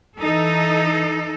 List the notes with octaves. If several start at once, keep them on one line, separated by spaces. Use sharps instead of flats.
E3 D#4 A4